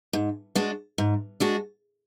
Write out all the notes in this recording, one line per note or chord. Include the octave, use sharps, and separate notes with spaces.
G#2
G#3 D4 F#4
G#2
G#3 D4 F#4